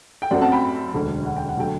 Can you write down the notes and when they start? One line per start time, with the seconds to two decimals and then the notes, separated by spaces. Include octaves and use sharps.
0.22 G5
0.31 F#2 F#3 A3 C4 D5 F#5
0.41 F#5 A5
0.52 G5 B5
0.94 E1 D2 D3
1.25 F#5
1.36 G5
1.49 F#5
1.57 D3 F#3 A3 G5